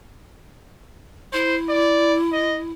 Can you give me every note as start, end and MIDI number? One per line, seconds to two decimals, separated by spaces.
1.33 2.72 64
1.33 1.56 72
1.69 2.16 74
2.33 2.58 75